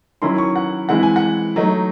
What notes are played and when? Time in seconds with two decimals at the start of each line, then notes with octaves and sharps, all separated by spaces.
0.22 D#3 F#3 C#4 E4 C6
0.38 C#6
0.56 F#5
0.89 E3 G#3 C4 E4 F#5
1.03 G#5
1.16 F#5
1.56 F#3 A3 D#4